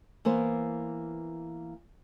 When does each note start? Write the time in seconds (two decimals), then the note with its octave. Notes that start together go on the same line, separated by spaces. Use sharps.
0.25 E3 A#3 B3 C5